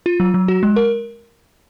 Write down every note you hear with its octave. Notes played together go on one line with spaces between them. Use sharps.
F4
F#3
F#3
F#4
G#3
A#4